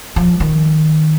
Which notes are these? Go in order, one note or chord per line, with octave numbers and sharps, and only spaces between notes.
F3
D#3